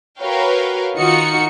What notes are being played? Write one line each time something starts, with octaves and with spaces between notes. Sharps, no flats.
F#4 A#4 B4 C#5 F5 G5
D#3 D#4 F4 F#4 C#7